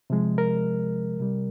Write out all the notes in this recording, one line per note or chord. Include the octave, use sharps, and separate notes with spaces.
C3 F3 G#3
A#4
C3 G3